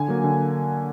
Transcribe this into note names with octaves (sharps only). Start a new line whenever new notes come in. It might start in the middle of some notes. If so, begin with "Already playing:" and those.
Already playing: D3 G#5
F#3 A#3
D3